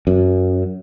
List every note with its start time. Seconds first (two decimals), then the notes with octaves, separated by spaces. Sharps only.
0.07 F#2